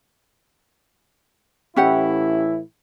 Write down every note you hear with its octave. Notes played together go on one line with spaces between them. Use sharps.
A2 E3 C#4 E4 G4 F#5